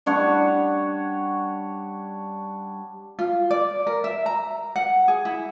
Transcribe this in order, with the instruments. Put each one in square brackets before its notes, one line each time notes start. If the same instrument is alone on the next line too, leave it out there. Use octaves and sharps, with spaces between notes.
[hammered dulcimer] G3 D4 C#5 F#5
[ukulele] F4
D5
A#4
E5
A#5
F#5
G#4
E4